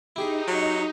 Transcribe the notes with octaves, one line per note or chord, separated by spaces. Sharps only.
D#4 E4 G4 G#4
F#3